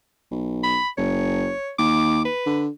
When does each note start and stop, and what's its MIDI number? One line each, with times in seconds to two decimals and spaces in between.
0.31 0.78 35
0.63 0.88 83
0.98 1.51 30
0.98 1.70 73
1.79 2.27 39
1.79 2.21 86
2.25 2.63 71
2.46 2.68 50